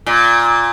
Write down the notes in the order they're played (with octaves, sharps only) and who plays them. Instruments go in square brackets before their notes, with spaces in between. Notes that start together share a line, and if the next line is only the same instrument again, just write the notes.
[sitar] A#2